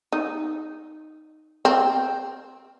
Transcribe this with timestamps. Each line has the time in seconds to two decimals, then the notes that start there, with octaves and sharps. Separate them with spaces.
0.12 D#4
1.65 C4